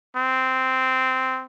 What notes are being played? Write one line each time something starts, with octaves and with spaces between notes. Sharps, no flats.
C4